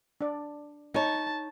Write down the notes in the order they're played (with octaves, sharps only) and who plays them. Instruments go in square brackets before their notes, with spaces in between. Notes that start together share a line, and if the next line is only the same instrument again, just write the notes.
[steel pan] D4 D5
[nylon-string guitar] D#4 C#5 [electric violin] A5